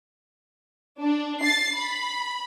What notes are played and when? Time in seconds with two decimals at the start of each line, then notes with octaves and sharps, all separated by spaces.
0.98 D4
1.41 A6 C7
1.76 B5